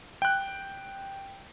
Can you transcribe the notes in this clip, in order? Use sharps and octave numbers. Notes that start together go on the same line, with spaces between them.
G5 F#6